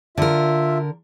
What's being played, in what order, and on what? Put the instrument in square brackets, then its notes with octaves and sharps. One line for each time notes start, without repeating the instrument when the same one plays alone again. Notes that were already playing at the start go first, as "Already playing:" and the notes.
[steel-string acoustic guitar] D3 A#4 [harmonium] F4 E5